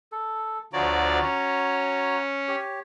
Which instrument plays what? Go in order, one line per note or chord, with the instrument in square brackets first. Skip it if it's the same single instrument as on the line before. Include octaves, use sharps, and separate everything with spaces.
[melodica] A4
[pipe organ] D2 F3 D5 [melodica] F#4 C#5 A#5
[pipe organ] C#4
[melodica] G4 C#5